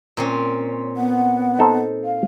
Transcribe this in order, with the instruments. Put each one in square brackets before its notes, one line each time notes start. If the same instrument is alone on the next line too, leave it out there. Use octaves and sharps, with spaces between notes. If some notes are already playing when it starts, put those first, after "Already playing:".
[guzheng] A#2 C4 C#4
[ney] B3 [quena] F#5
[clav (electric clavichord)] D#4 A4 C5
[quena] F5